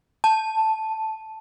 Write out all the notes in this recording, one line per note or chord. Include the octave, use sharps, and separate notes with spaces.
A5